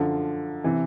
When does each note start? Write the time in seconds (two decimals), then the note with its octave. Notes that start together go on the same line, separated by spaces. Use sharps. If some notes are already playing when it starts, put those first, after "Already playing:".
Already playing: F#2 D3 F3
0.64 C3 E3